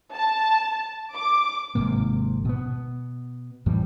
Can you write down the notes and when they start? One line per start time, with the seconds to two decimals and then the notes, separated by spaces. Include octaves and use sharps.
0.15 A5
1.16 D6
1.75 G#1 G#2 C3 A#3
2.45 B2 B3
3.66 F2 A2 E3 G3